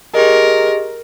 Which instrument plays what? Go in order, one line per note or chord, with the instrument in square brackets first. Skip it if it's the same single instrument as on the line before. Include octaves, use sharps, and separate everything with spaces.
[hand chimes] G4 G#4 D#5 [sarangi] A#4